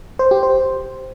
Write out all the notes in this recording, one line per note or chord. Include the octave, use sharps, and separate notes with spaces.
C5
G4
C5